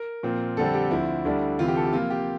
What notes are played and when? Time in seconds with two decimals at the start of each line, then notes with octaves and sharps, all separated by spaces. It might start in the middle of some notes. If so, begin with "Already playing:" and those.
Already playing: A#4
0.23 A#2 F3 C4
0.57 F2 D3 G3 C4 A4
0.74 G4
0.91 D2 D3 F3 C4 E4
1.25 D2 D3 G3 D4
1.59 D2 C3 E3 F4
1.68 G4
1.77 A4
1.85 G4
1.92 C3 F3 A#3 F4
2.10 G4